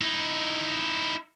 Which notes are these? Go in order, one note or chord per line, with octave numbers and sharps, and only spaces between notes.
D#4 E4